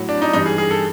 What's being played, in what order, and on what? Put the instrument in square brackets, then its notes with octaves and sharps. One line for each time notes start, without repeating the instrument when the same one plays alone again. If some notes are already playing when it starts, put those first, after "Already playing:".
Already playing: [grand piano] A2 F#3
D4
D#4
G2 E3 G3 D#4
G#4
G#4
A4